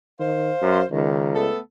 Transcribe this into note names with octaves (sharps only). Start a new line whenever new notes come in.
D#3 C5 F5
F#2
C#2 D#3
A3 B3 A4